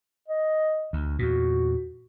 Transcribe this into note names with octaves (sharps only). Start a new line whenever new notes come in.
D#5
D2
E2 A#2 F#4